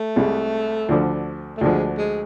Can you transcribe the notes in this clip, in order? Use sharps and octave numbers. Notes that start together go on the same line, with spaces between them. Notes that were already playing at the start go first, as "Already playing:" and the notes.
Already playing: A3
C2 C3 G#3
D2 D3 F3
A3
D2 D3 F3 G#3
G#3